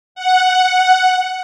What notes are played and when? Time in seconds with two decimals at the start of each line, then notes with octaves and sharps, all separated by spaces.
0.15 F#5